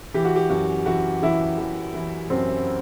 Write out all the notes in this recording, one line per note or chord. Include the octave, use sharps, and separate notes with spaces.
E3 G4
F#4
G4
F#2 F#4
E3 F#4
E3 E4
E3
E3
F#2 C4